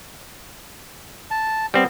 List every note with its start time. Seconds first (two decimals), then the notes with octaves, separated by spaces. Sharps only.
1.31 A5
1.74 G3 B3 C4